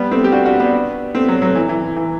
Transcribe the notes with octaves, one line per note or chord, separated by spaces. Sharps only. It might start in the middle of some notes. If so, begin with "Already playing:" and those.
Already playing: G3 B3
A3 C4
G4
D4 F#4
D4 F#4
B3 D4
A3 C4
F#3 A3
F#3 A3
E3
E3
E3